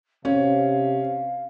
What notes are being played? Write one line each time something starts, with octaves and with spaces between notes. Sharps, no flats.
C3 C#4 F5